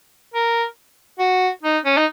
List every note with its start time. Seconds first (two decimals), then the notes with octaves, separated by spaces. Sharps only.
0.34 A#4
1.19 F#4
1.63 D#4
1.84 C#4
1.97 D#4